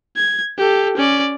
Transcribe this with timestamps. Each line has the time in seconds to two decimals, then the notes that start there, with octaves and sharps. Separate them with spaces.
0.16 G#6
0.58 G4 A4
0.97 C#4 D5